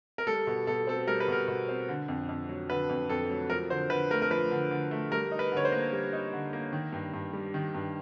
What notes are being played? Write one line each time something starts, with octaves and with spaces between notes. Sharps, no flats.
A#4
G3 A4
B2
B2 A4
C4 A4
G3 A#4
B4
B2 A#4
B2
C4
D3
F2
F2
F#3
D3 B4
F2
F2 A4
F#3
F3 A#4
D3 C5
D3 B4
A3 A#4
A#4
F3 B4
D3
D3
A3
G3 A#4
D#4
B4
D3 C#5
C5
A#3
G3
D#4
D3
A#3
D#3
G2
G2
G3
D#3
G2